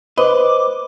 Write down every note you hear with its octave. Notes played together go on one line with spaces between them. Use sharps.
B4 C5 D#5 D6